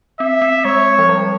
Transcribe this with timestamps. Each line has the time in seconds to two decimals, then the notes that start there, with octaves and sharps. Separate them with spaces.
0.20 C4 E5
0.42 C4
0.65 G#3 C#5
0.99 F3
1.09 G3